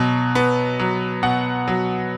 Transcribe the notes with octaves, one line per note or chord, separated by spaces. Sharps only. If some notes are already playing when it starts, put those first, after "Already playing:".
Already playing: B2 F#3
B3
F#3
B2 F#5
F#3